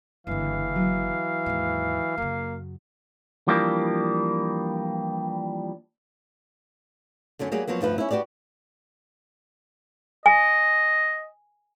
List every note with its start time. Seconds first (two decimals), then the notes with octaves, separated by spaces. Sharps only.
0.27 F#1 G2 D3 E3 F5
0.75 F#3
1.46 D#2 G#2
2.18 F#2 C#3 A#3
3.48 E3 F3 G3 A#3 D4
7.39 F#2 D3 F#3 C#4
7.52 F#3 G3 A#3 G4 G#4
7.68 F3 F#3 A#3 B3
7.81 D2 G2 F3 B4
7.98 C#4 E4
8.11 F#4 G4 B4 D5
10.26 D#5 G#5